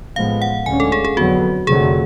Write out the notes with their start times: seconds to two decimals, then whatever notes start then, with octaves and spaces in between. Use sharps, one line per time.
0.16 A1 A2 F3 G#3 B3 F5
0.42 F#5
0.66 D2 D3 G#3 C#4 G#5
0.80 A4
0.92 G#4
1.05 G#4
1.17 F2 D3 F#3 B3 F#4
1.67 F1 F2 D3 F#3 A3 G#4